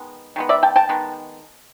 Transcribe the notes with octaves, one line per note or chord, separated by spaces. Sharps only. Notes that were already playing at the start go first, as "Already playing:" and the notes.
Already playing: D#3 G#3 B3
D#3 G#3 B3
D5 E5
G5 A5
G5 A5
D#3 G#3 B3